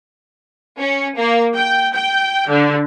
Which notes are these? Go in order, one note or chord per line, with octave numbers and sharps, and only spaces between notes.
C#4
A#3
G5
G5
D3